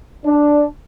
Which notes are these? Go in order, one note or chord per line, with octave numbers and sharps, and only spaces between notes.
D4